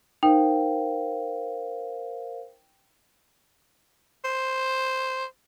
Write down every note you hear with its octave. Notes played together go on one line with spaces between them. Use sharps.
D#4 A#4 C5 F5 G5
C5